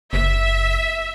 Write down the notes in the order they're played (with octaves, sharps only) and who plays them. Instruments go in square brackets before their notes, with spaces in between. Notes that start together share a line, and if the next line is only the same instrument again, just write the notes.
[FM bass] F#1 [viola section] E5